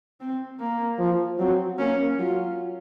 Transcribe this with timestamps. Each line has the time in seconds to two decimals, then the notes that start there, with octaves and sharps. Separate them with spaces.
0.20 C4
0.60 A#3
0.99 F3
1.39 F#3 C4
1.79 A#3 C#4
2.18 F#3 F4